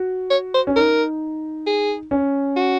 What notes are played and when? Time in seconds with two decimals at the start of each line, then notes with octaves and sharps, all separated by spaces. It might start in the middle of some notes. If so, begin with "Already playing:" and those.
Already playing: F#4
0.30 C#5
0.54 C5
0.67 C#4
0.76 D#4 A#4
1.66 G#4
2.11 C#4
2.56 F#4